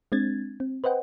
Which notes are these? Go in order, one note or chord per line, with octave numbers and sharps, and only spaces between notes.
G#3 C4 D4 G#6 A6
C4
B4 C5 D#5 F#5 G5